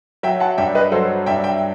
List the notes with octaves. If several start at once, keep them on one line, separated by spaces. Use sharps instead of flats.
F#3 E5 G5
F#5 A5
G2 E5 G5
B4 D#5
F#3 A4 C5
G2 E5 G5
E5 G5